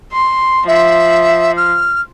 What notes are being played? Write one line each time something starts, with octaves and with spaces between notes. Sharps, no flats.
C6
F3 E5
F6